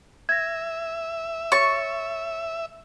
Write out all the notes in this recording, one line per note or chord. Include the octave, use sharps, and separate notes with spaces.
E5 G#6 A#6
C#5 C#6 A6